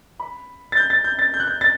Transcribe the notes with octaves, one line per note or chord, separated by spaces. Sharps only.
B5
A6
G6
A6
G6
A6
G6
F#6
G6
A6